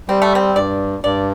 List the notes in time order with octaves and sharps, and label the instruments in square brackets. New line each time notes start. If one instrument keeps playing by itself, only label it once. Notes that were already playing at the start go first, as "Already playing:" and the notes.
[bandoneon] G3 [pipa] C4
[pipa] A3
C4
[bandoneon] G2 [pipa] D5
[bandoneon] G2 [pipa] D5